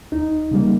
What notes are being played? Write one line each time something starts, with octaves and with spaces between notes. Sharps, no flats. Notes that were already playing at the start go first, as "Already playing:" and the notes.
D#2 D#4
C#3 G3 A#3